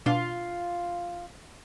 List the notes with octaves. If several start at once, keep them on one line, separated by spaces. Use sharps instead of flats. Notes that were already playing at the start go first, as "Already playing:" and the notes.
B2 D4 F4